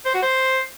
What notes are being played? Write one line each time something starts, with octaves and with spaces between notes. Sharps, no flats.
C5
F#4
C5